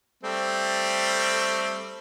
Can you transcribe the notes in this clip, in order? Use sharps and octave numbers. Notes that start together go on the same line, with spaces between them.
G3 A3 C4